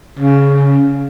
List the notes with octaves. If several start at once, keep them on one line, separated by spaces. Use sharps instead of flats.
C#3